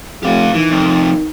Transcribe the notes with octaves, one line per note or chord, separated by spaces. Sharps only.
F1 G4 F5
D#3 E3
F2 C3